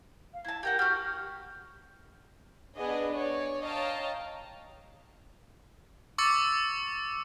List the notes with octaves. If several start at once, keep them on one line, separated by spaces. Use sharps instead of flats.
F5
E4 A5 G#6
G4 A#4 F#5 G6
F#4 G4 F6
B3 D4 G#4 D#5
C#5 D5
C#5 D#5 F5 G5 A5 A#5
C#6 D6 E6 A6 C#7